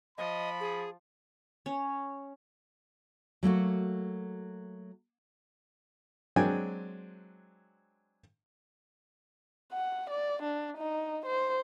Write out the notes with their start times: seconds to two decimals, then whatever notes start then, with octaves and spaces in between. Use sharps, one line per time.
0.18 F3 D#5 B5
0.60 G#4
1.66 C#4
3.43 F#3 A3 A#3 F#4
6.36 F#3 G#3 C4 D4 G5 G#5
9.73 F#5
10.11 D5
10.43 D4
10.78 D#4
11.26 C5